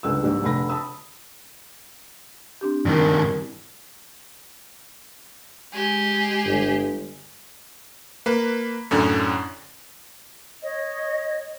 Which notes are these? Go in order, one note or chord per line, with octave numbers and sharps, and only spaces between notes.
G1 C#2 E6
A#1 G#2 G3
F1 D3 B5 A#6
A5 B5 D#6 E6
C4 D4 G4
G2 D#3 E4 A#4
G#3 G4 G#4
G1
A#3 B4
F#2 A2 D3 C#4
C#5 D#5